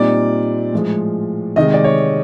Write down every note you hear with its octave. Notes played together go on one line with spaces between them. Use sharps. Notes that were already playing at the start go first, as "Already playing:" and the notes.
Already playing: A#2 G3 C4 D#4 D5
A2 F3 G#3
C3 D#3 G#3 D#5
D5
C#5